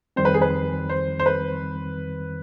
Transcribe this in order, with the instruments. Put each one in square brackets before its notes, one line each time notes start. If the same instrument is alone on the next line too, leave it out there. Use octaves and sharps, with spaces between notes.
[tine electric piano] F2 D#3 G3 C4 [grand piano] C5
[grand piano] B4
G#4
B4
C5
C5
B4